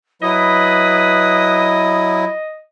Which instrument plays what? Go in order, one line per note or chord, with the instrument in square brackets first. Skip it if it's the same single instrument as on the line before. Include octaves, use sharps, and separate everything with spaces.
[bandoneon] F#3 E4 [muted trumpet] B4 [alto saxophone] D#5 [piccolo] D#6